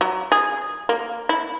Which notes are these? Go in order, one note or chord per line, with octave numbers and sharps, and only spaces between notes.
F#3
G#4
A#3
E4